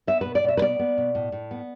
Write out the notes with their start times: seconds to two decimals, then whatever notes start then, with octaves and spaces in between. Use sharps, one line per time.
0.07 B3 E5
0.21 B2 B4
0.35 D5
0.44 B2 E5
0.57 B4
0.62 B3 D5
0.79 B3
0.98 B2
1.15 A2
1.32 A2
1.51 B3